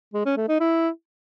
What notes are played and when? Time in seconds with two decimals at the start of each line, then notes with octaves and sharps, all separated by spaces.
0.14 G#3
0.25 C#4
0.37 A3
0.48 D#4
0.60 E4